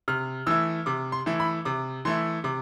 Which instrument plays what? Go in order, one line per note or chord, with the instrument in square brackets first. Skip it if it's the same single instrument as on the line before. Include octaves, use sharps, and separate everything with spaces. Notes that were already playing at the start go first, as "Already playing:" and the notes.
[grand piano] C3 F6
E3 A3 E4 E6
C3 D6
C6
E3 A3 E4
B5
C3 D6
E3 A3 E4 C6
C3 D6